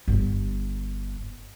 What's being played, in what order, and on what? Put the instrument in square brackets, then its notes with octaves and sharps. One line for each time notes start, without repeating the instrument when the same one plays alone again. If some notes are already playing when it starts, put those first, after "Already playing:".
[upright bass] G1